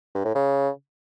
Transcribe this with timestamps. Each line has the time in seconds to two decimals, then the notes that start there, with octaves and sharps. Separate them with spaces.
0.15 G2
0.25 A2
0.35 C#3